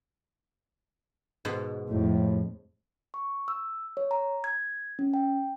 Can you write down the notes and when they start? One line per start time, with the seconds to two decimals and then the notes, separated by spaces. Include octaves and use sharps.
1.45 G#2 B2
1.89 F2 A2
3.14 C#6
3.48 E6
3.97 C#5
4.11 A#5
4.44 G#6
4.99 C#4
5.14 G5